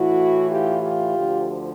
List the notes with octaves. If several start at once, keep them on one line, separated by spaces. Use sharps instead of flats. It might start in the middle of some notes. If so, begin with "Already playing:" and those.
Already playing: A2 E3 E4 F#4
F4 G4
F4 G4
D2 D3 F3